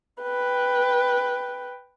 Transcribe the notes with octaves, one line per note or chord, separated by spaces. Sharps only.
B4 G5